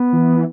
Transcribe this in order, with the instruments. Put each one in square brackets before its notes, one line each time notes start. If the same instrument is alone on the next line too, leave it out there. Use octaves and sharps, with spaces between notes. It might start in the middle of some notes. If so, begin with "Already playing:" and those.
Already playing: [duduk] B3
[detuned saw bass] E3